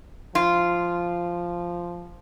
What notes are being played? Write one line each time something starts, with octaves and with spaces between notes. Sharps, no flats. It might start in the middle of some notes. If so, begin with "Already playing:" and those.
F3 F4